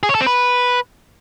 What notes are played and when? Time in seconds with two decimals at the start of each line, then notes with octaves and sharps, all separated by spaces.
0.03 G#4
0.09 C#5
0.15 A4
0.21 C4
0.27 B4